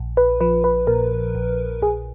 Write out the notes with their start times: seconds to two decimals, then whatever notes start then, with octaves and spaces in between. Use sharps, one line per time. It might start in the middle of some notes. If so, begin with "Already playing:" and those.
Already playing: A#1
0.17 B4
0.41 F3 B4
0.64 B4
0.87 A#2 A#4
1.35 A#1
1.82 A#1 G#4